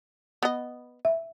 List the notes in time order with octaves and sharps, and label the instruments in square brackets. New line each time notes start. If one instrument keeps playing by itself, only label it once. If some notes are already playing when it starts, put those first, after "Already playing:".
[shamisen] B3 D#5
[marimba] E5